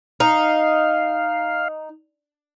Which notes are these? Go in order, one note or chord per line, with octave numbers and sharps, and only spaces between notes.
D#4 F5